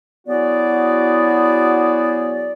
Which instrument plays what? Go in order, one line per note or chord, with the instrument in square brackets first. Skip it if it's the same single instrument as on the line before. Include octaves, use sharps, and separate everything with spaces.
[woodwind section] F#3 B3 E4 F#4 G#4 D5